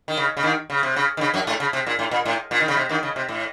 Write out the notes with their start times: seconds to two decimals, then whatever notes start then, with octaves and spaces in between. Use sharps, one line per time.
0.08 D#3
0.17 C#3
0.37 C#3
0.43 D#2 D#3
0.70 C#3
0.83 C3
0.96 C#3
1.17 D#3
1.21 C#3
1.34 F#2 F#3
1.47 A2 A3
1.60 C#3
1.73 C3
1.86 A#2
1.99 A2
2.11 A#2
2.25 A2
2.51 A#2
2.60 D#3
2.68 C#3
2.77 C3
2.89 D#2 D#3
3.03 C#3
3.16 C3
3.28 A2